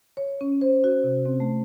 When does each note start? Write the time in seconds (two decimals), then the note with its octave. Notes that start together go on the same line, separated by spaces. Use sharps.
0.17 C#5
0.41 C#4
0.61 C5
0.84 F#4
1.04 C3
1.26 C4
1.40 A3